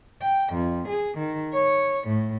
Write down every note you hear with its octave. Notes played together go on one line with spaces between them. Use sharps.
G5
F2
G#4
D#3
C#5
A2